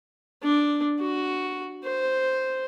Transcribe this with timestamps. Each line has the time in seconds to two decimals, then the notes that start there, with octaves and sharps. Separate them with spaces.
0.43 D4
1.01 F#4
1.84 C5